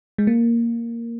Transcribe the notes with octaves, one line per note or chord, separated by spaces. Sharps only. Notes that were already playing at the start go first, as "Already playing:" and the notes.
G#3
A#3